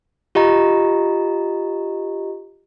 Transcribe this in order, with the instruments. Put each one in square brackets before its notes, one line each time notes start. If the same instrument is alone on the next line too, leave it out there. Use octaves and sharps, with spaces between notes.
[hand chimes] F4 G4 D#5 A#5